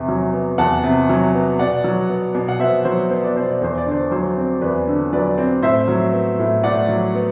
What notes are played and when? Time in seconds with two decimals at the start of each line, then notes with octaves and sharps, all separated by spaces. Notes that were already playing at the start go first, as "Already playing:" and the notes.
Already playing: E2 C3
0.08 F#3
0.33 B3
0.58 E2 F#5 A5
0.84 C3
1.09 F#3
1.34 B3
1.59 B2 D5 F#5
1.84 F#3
2.09 B3
2.35 B2
2.48 F#5
2.59 B2 C5 E5
2.85 F#3 C5
3.10 B3 C5
3.23 D5
3.36 B2 C5
3.51 D5
3.62 E2 C5
3.78 D5
3.86 D3 C5
4.12 F#3 C5
4.37 C4
4.61 E2 B4 D5
4.88 D3
5.13 F#3 B4 D5
5.38 C4
5.62 A2 C5 E5
5.88 F#3
6.13 B3
6.39 A2
6.63 A2 D5 F#5
6.88 F#3
7.15 B3